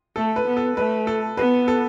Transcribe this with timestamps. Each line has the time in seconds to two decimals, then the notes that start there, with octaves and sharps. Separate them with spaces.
0.16 A3 A4
0.36 B4
0.47 B3
0.57 A4
0.77 A3 B4
1.07 A4
1.37 B3 B4
1.68 A4